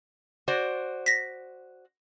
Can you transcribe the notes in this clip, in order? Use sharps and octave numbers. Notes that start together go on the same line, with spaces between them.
F#4 C5 D5
A#6 B6